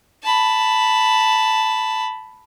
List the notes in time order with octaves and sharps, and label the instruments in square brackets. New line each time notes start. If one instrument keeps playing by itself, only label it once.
[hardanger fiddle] A5 B5